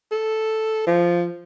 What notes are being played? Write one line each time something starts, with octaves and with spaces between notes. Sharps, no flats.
A4
F3